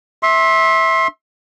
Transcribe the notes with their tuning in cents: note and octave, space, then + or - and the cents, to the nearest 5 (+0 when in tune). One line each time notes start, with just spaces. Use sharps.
E5 -15 C6 +25